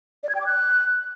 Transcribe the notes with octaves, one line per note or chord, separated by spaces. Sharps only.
D5
G#6
G5
D6
F#6